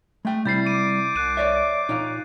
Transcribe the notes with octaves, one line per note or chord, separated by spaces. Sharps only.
G#3 A3 G5
C3 G3 E4 G6 A6 C7
D6 D#7
C2 F#6 D#7
C#5 D5 E5
A#2 D#4 C#5 F5